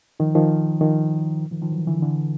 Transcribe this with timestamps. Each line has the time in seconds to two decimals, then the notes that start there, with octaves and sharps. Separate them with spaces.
0.20 D#3 F3
0.35 D#3 F3
0.81 D#3 F3
1.51 D#3 F3
1.62 D#3 F3
1.72 E3 F#3
1.87 D3 E3
2.02 D3 E3